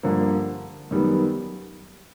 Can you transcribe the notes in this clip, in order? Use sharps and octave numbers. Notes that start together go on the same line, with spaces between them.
G2 D3 F3 A#3
F#2 D#3 G3 B3